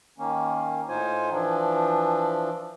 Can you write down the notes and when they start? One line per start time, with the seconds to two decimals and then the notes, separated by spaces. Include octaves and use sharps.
0.18 D#3 A#3 C#4
0.88 A2 D#4 F4 C5 G#5
1.32 E3 F3 D4